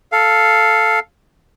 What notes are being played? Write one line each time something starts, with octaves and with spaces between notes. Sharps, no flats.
A4 F5